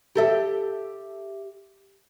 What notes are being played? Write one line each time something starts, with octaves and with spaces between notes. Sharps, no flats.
G4 A4 E5